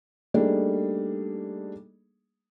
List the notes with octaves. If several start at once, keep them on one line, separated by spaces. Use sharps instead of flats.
G3 A3 A#3 D4 D#4 G#4